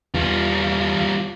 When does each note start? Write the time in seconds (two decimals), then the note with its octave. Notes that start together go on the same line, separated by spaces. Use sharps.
0.14 E2 G3 F4